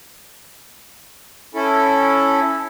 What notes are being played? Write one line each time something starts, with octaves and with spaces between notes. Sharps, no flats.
C#4 E4 A4